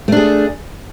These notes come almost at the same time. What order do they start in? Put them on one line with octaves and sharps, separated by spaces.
A3 D4 G#4